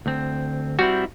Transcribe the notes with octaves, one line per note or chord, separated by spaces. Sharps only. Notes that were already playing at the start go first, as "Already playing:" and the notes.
D2 C4
G3 C4 E4 F#4